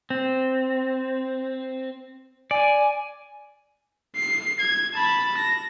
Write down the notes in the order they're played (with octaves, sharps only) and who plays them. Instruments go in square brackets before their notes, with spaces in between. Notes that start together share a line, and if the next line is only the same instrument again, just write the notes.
[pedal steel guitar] C4
[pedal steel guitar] D5 [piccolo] G#5
[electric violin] C7
G#6
A5 B5
A#6